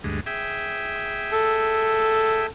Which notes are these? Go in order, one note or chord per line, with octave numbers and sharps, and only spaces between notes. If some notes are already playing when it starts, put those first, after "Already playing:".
D2 G2 G#3
G#4 E5 G5
A4